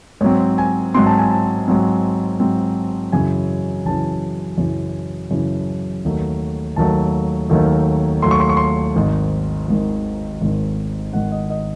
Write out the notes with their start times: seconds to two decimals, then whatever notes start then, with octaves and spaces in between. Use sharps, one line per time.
0.21 G#2 F#3 C4 C#5
0.58 G#5
0.94 G#2 F#3 C4 C6
1.06 A5
1.19 G#5
1.30 A5
1.68 G#2 F#3 C4
2.40 G#2 F#3 C4
3.12 F#2 C#3 E3 G#5
3.86 F#2 C#3 E3 A5
4.58 F#2 C#3 E3
5.31 F#2 C#3 E3
6.05 D#2 D#3 F#3 A3
6.76 D#2 D#3 F#3 A3 A5
7.50 D#2 D#3 F#3 A3
8.22 D#2 D#3 F#3 A3 C6
8.31 C#6
8.40 C6
8.49 C#6
8.57 C6
8.96 G#1 G#2 D#3
9.68 G#1 G#2 D#3
10.41 G#1 G#2 D#3
11.13 G#1 G#2 D#3 F#5
11.32 D#5
11.50 D#5